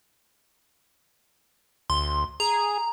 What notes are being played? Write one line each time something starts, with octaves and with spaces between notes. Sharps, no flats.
D2 C6
G#4 A#5